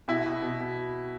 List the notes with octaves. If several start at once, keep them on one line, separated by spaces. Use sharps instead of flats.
B2 E4
B2
B2
B2